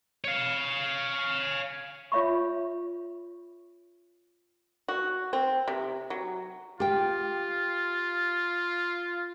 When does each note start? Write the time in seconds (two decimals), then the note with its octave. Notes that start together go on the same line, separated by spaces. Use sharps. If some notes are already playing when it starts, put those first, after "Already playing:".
0.24 C#5 F5
2.12 F4 C#5 E5 B5 C#6
4.88 F#4
5.33 C4
5.68 C3
6.10 F#3
6.80 F4 G4 G5